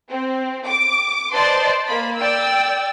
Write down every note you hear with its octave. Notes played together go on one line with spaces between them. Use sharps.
C4
D6
B4 C5 D5 D#5 A5 C6
A#3 B5
D5 G5 E6